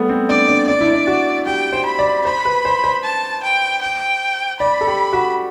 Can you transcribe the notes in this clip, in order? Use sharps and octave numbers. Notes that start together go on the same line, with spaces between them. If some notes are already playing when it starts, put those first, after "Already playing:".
Already playing: G3 A3 B3
C4
D4 D5
D4
D4 D5
E4
D4
F#4
G4 G5
C5
B5
D5
C5 B5
B4
C5
C5
A5
G5
G5
D5 B5
A4
G4
F#4